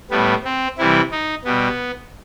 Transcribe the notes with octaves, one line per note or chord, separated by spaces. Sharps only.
A2 G3 B3
C4
C3 E3 G3 E4
D#4
B2 G3 B3